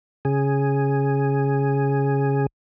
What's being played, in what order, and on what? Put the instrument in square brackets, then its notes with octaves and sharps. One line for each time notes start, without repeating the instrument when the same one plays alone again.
[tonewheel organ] C#3 G#4